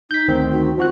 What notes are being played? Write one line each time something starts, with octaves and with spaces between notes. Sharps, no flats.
D#4 G6 B6
D2 D#3 C4
F#4
F3 F4 F#4 F#6